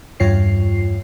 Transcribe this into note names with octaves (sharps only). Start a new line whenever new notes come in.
E2 G2 F4 C#5 C7